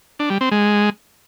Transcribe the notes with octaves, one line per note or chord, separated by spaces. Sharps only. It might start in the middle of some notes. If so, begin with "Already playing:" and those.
D4
G3
C4
G#3